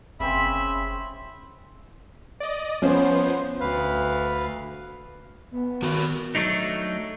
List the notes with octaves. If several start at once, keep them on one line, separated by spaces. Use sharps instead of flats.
F#1 C#3 C4 E5 B5
D5 D#5
F3 B3 C#4 C5
D2 B4 F5
B3
D#3 F#4 A#4
F#3 A3 D4 D#4